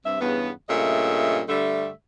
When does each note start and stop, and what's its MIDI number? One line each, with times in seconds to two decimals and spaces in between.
0.04 0.20 43
0.04 0.20 48
0.04 0.20 76
0.20 0.50 40
0.20 0.50 43
0.20 0.50 49
0.20 0.50 59
0.69 1.42 43
0.69 1.42 46
0.69 1.42 49
0.69 1.42 57
0.69 1.42 75
0.69 1.42 76
1.48 1.89 43
1.48 1.89 50
1.48 1.89 55
1.48 1.89 57
1.48 1.89 76